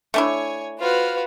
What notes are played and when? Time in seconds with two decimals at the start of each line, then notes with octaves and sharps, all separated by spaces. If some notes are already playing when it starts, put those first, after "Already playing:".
0.14 A3 D4 E4 C#5 G#5
0.80 F4 F#4 B4 C5 F6